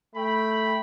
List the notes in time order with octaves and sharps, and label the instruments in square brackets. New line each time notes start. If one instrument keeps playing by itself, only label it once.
[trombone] A3 [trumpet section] G5 B5